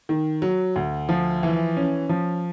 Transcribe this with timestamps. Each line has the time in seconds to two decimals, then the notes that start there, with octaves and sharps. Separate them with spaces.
0.09 D#3
0.42 F#3
0.76 D2
1.09 F3
1.43 E3
1.77 C#4
2.09 F3